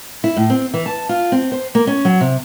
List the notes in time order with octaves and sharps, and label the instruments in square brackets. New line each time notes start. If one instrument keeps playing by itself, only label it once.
[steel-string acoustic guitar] E4
A2
C4
E3
A5
F4
C4
C5
A#3
C#4
F#3
C3